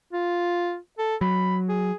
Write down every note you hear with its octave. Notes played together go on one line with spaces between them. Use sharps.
F4
A4
F#3 B5
G#4